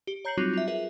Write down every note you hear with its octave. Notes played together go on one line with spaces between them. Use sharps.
G4
C#5 A#5 G6 C7 C#7 F#7
F#3 G3 C4 D#4 F4 F#4
F4 E5
F4 G#4 A#4 B4 E5